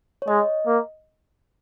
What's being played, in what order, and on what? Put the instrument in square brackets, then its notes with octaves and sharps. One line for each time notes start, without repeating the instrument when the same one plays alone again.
[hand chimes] C#5
[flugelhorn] G#3 [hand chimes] D#5
[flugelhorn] A#3